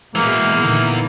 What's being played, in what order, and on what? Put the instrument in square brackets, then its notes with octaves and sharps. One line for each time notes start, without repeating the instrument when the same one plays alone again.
[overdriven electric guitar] E2 E3 [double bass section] B2 G#3 [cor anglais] A#3
[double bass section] A#2 D3 D#3